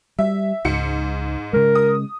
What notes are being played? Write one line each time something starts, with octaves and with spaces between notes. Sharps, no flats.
G3 E5
C#2 G#2 C#7
C#3 G#3 A#4
D#6